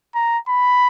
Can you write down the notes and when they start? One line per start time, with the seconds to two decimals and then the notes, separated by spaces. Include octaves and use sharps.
0.15 A#5
0.48 B5